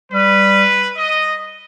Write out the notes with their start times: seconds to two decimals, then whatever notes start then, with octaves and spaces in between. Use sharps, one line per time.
0.12 G3 B4
0.97 D#5